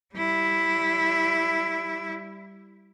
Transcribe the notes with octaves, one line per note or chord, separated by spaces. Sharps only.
G3 E4